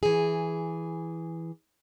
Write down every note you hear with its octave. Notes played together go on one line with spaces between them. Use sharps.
E3 G#4